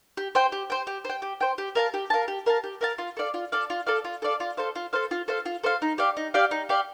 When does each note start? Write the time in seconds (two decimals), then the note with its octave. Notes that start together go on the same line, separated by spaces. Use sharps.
0.17 G4
0.35 C5 G5
0.52 G4
0.70 C5 G5
0.87 G4
1.05 C5 G5
1.22 G4
1.41 C5 G5
1.58 G4
1.75 A#4 F5 A5
1.94 G4
2.10 A#4 F5 A5
2.28 G4
2.46 A#4 F5 A5
2.64 G4
2.81 A#4 F5 A5
2.98 F4
3.17 A4 D5 F5
3.34 F4
3.52 A4 D5 F5
3.70 F4
3.87 A4 D5 F5
4.04 F4
4.22 A4 D5 F5
4.40 F4
4.57 A4 C5 F5
4.75 F4
4.93 A4 C5 F5
5.11 F4
5.28 A4 C5 F5
5.46 F4
5.63 A4 C5 F5
5.82 D#4
5.98 G4 D5 F5
6.17 D#4
6.34 G4 D5 F5
6.51 D#4
6.69 G4 D5 F5